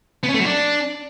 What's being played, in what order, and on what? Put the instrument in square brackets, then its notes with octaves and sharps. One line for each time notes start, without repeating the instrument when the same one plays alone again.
[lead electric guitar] B3
C#4
A3
F#3
D4